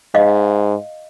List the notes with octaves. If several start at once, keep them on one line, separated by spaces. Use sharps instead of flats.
G#2 D#5 F5